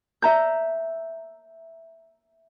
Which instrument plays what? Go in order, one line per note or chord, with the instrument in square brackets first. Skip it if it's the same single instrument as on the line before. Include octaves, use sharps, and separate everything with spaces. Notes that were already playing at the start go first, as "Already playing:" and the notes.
[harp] E5 A#5 G6